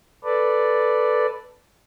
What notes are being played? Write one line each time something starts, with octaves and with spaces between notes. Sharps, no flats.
A4 B4 D5